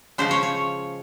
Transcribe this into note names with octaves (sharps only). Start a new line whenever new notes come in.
C#3 F3 G#3 C5
C#5
C#5